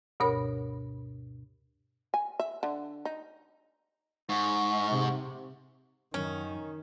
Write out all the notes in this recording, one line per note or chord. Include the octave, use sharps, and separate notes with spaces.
D2 G2 B2 A#4 C#5 B5
G#5
E5
D3
D#4
G#2 C#6
C3
F#2 D#3 C#4